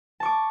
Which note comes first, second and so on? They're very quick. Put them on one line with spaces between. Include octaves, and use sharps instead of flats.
A5 C#6 D6